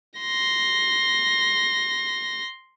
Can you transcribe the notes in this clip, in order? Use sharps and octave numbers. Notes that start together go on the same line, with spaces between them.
C6 A#6